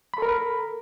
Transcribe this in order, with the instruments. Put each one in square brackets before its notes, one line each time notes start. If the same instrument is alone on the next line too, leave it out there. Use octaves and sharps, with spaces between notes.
[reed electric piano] B5
A4
A#4